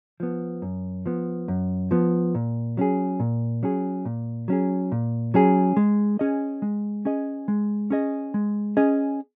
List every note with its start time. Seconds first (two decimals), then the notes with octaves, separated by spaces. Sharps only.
0.20 F3 B3
0.62 F#2
1.06 F3 B3
1.48 F#2
1.91 F3 B3
2.35 A#2
2.77 F#3 C#4 G#4
3.20 A#2
3.63 F#3 C#4 G#4
4.05 A#2
4.48 F#3 C#4 G#4
4.92 A#2
5.34 F#3 C#4 G#4
5.77 G#3
6.19 C#4 G#4 D#5
6.62 G#3
7.05 C#4 G#4 D#5
7.48 G#3
7.90 C#4 G#4 D#5
8.34 G#3
8.77 C#4 G#4 D#5